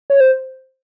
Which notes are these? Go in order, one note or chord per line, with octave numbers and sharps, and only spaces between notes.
C#5
C5